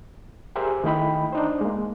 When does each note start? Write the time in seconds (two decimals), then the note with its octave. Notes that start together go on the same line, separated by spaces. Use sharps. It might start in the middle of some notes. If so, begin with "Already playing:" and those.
0.56 G4 G#4 A#4 C5 E5 G#5
0.84 D#3 A3 E4 D#5 G5 B5
1.33 D4 D#4 C5
1.61 G#3 A#3